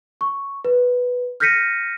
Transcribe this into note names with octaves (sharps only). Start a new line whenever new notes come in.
C#6
B4
F6 G6 A#6 B6 C#7 D#7